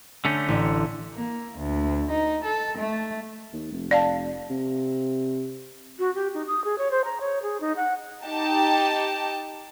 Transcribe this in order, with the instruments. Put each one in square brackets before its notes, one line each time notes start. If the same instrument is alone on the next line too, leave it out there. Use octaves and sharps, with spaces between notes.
[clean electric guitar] D3 A3 C#4 [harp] G6
[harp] A1
[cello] A#3
D2
D#4
A4
A3
[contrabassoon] D#2
F1
[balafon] D5 F5 A5
[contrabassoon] C3
[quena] F#4
G4
D#4
D#6
G#4
C#5
C5
A#5
C#5
G#4
D#4
F#5
[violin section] D#4 G4 A5